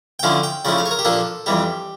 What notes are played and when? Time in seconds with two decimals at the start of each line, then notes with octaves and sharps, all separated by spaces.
0.19 G5
0.23 D3 F3 C#4 E4 F5
0.43 G5
0.65 C#3 F3 A3 E4 D5
0.78 F5
0.86 C#5
0.91 A#4
0.99 G4
1.05 A#2 F3 A#3 D4 A4
1.46 F2 E3 G3 G4